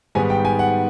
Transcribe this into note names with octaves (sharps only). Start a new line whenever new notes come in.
G#2 D#3 G3 B3 G#5
G5
G#5
F#5